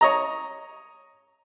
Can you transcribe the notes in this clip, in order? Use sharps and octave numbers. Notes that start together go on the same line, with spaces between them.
C#5 D#5 A#5